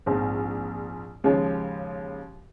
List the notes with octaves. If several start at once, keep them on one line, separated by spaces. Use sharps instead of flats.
A#1 G#2 F3 C4
D#2 C#3 F3 G#3 C#4